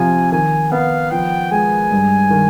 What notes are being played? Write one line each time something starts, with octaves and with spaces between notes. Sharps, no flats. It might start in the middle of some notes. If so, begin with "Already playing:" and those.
Already playing: C3 F3 G#5
D#3 G#5
B3 F5
F3 G5
G#3 G#5
G2
D#3